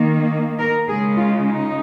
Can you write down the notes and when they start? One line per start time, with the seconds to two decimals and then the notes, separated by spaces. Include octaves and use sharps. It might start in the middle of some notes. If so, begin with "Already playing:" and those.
Already playing: D#3 A#3
0.59 A#4
0.88 C#3 G#3 G#4
1.16 F4
1.45 D#4